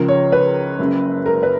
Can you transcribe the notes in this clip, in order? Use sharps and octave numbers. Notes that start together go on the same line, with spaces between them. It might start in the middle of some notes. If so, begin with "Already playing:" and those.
Already playing: C#2 C#3 F3 A#4
C#5
B4
F#1 F#2 C#3
A#4
B4